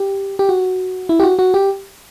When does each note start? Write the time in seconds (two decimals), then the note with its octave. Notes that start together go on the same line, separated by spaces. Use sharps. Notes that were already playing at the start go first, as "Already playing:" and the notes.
Already playing: G4
0.39 G4
0.49 F#4
1.09 E4
1.20 G4
1.23 F#4
1.39 F#4
1.54 G4